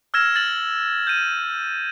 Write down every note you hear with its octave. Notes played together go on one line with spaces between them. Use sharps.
E6 F6 G#6 A#6 E7
A6 F#7
G6 D#7